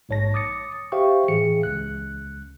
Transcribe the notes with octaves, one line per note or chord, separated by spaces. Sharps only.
A#1 G#2 C#5 A5 A#6
D6 D#6 A6 C#7
G4 C5 E5 F5 G5 C#6
A2 E3 G#4 C#7
C#2 F#6